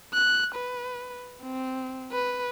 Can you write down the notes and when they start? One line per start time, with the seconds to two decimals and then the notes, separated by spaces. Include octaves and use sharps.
0.14 F#6
0.55 B4
1.43 C4
2.12 B4